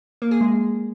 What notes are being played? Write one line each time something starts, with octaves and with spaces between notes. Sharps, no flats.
A#3
G#4
G#3